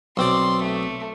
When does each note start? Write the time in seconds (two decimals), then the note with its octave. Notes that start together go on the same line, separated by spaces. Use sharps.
0.17 B1 C4 D5 C6
0.62 A3